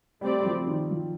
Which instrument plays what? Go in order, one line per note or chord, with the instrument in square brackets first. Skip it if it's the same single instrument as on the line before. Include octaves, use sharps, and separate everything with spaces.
[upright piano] G3 [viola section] A3 C4 G4 D5
[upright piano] G3
F3
D#3
F3